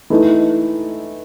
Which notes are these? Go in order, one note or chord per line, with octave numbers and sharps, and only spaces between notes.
E3 A3 D#4